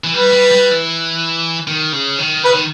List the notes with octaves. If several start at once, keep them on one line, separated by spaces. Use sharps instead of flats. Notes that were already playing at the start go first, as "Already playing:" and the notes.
E3
G3 B4
G3
G3
E3
D#3
C#3
D#3
C#3 B4
D#3